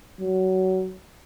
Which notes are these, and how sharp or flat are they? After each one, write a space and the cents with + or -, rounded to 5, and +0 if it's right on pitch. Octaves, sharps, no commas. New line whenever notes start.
F#3 +20